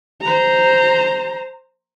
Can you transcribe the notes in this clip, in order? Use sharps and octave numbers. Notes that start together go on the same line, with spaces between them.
C5 A#5